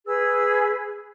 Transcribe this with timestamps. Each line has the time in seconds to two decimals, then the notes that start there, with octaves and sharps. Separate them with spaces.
0.05 G#4 B4 E6